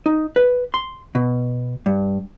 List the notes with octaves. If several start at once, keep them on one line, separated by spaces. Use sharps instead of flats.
D#4
B4
C6
B2
G2